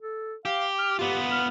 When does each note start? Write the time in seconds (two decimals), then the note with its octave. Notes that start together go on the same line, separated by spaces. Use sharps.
0.02 A4
0.45 G4 F5
0.78 F6
0.99 B3 F4 G4
1.32 F6